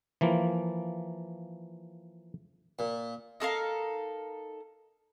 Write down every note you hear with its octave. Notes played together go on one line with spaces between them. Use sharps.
E3 F3 A#3
A#2
D#4 A4 A#4 F5